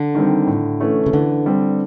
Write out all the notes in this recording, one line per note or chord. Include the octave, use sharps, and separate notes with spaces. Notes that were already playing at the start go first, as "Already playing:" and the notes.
Already playing: D3
D#3 G3 C4
A2
E3 A3 C#4
C#3
D3 E3
G3 C4